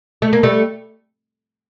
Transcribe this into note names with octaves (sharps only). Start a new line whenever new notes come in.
A3
A#3
G3 A3